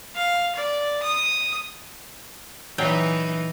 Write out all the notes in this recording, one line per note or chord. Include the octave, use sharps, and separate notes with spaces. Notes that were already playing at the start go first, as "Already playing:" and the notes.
F5
D5
D#6
A#2 E3 F#3 D#4 G5